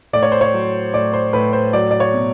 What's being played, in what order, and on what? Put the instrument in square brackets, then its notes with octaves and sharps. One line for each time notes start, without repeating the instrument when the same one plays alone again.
[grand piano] A2 D5
C#5
C5
C#5
F#3
A2 D5
C5
A2 B4
C5
F#3 D5
D5
C#5
B2